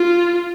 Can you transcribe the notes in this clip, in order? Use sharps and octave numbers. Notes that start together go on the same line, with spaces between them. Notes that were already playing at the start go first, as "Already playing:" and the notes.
Already playing: F4